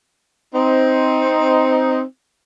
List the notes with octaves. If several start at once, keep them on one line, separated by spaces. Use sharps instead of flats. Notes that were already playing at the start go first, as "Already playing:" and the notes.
C4 D#4